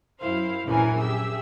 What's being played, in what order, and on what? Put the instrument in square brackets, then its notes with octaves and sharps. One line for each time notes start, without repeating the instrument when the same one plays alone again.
[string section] F#2 E4 C5 F5
A#1 F#2 E3 C#4 A#4 G#5
G4 G#4 E5 E6